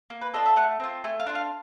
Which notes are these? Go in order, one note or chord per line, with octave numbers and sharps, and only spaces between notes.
A#3
B4
D4 F4 A4 D#5
E5
A3 F#5
C4 F4
A3 G#5
F5
D4 F4
F5